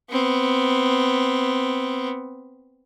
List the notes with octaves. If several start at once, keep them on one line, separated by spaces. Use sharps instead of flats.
B3 C4